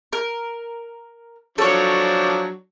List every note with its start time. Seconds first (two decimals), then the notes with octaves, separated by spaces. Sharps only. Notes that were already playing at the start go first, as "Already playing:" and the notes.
0.13 A#4
1.58 F3 F#3 D4 A4 C#5